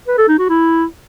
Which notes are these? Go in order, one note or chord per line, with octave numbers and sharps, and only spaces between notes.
B4
A4
D#4
F#4
E4